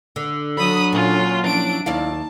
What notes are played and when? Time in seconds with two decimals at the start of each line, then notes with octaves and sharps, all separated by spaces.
0.16 D3
0.57 F#3 D4 A4 B5 D#6
0.93 A#2 C#4 F4
1.44 F3 C#4 D4 E4 D7
1.86 D#2 E4 D5 F5 A5